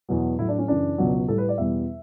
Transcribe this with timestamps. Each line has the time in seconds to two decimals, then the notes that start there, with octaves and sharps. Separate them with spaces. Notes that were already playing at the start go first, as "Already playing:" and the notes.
0.09 E2 B2 F#3
0.39 A2 F#3 E4
0.48 D4
0.59 C#4
0.68 F#2 C#3 E3 D4
0.98 C#2 B2 F#3
1.28 A2 G3 A4
1.38 B4
1.49 D5
1.58 E2 B2 G3 E5